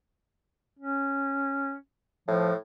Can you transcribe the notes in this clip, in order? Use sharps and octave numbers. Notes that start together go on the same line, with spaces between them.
C#4
A2 F3